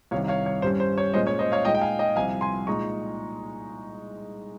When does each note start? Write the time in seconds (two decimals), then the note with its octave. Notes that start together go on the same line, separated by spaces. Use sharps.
0.11 C2 C3 D#3 C#5 F5
0.28 C#5 F5
0.46 C#5
0.62 G2 G3 C#4 C5
0.80 C5
0.98 C#5
1.14 A#2 G#3 C#4 C5 D#5
1.27 C#5
1.39 C5 D#5
1.52 C#5 F5
1.64 A#2 G#3 D#4 D#5 G5
1.75 G5
1.81 F5 G#5
1.99 D#5 G5
2.16 C2 C3 F3 F5 G#5
2.41 G#5 C6
2.67 A#2 G#3 D#4 A#5 C#6